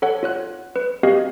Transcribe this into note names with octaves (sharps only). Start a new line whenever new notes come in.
A4 C#5 F#5
F4 C#5 F#6
B4
C4 F#4 G4 A#4 D#5 F5